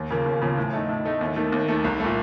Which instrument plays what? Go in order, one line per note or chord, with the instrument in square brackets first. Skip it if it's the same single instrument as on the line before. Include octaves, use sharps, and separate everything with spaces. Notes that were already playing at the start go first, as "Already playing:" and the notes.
Already playing: [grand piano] D#2
C#3 F3 A#3
D#2
C#3 F3 A#3
A2
A3 D#4
A2
A3 D#4
D#2
D#3 A3
D#2
D#3 A3
C2
A#2 A3